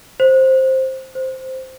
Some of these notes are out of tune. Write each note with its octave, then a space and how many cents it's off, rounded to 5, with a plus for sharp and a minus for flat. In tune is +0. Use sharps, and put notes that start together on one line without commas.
C5 +10
C5 +0